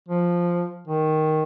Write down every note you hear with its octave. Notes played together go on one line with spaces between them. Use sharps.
F3
D#3